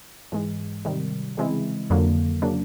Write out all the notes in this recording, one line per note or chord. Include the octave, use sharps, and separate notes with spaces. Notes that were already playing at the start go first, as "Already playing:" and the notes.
G#2 E3 G#3
C3 D#3 G3
C#3 E3 G#3 C4 E4
F2 D3 F#3 A#3
C#3 F#3 A#3 D4